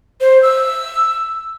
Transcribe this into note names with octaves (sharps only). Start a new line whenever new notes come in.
C5
E6